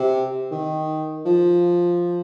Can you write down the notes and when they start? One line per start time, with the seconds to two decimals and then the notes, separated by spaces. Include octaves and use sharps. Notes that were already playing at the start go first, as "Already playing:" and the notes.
Already playing: C3
0.51 D#3
1.25 F3